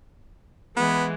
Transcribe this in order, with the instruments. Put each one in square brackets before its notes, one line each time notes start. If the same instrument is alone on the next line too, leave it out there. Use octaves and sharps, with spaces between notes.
[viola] E3 G#3 [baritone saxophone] B3